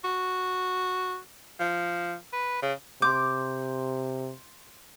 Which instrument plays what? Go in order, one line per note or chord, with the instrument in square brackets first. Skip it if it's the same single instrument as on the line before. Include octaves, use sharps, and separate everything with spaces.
[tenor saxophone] F#4
F3
B4
C#3
[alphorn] C3 [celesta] C6 G6 [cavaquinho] D6